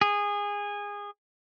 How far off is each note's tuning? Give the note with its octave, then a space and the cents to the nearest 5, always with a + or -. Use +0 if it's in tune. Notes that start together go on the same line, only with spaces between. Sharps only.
G#4 -20